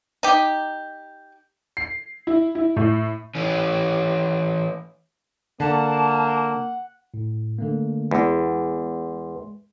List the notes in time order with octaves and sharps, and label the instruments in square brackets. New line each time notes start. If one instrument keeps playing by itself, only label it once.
[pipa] D#4 G4
[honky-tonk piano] C7
E4
E4
A2
[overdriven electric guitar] E3 C#4
[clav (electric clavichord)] D3 [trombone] A#3 [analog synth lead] F#5 [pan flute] A5
[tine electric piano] A2
D3 A3 A#3
[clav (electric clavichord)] E2 [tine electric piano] G#3 C6